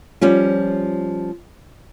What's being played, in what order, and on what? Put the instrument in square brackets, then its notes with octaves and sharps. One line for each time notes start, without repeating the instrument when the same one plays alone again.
[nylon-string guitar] F3 G3 C#4 F4